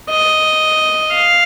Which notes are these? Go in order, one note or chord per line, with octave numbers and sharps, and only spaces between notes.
D#5
F5